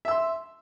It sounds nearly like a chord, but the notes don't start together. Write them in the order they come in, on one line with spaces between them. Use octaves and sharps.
E5 E6 C6